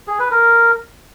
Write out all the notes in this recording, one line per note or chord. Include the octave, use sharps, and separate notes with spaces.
G#4
B4
A#4